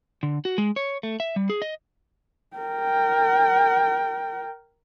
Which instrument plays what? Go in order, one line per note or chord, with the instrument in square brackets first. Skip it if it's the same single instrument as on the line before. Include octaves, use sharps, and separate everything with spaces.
[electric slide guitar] D3
F#4
G#3
C#5
A3
E5
G3
G#4
D#5
[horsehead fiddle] A#4 G5